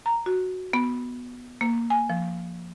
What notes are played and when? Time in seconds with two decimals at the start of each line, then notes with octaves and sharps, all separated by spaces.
0.06 A#5
0.26 F#4
0.73 B3
1.61 A#3
1.90 G#5
2.10 F3